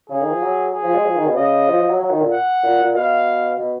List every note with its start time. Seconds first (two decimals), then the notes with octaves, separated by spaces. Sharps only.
0.10 C#3 G#4
0.21 D#3
0.31 F3
0.42 F#3
0.73 G#4
0.83 F3
0.94 G#3
1.05 F3
1.16 D#3
1.26 B2
1.36 C#3 D#5
1.68 F3
1.78 F3
1.89 F#3
2.00 F#3
2.10 D#3
2.21 A#2
2.31 F#5
2.63 A#2
2.79 A#2
2.95 B2 F5
3.58 B2